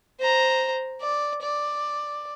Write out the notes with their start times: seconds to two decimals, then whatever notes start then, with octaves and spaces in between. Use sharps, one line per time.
0.20 C5 A#5
1.01 D5
1.42 D5